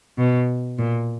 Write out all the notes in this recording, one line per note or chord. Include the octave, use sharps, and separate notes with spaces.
B2
A#2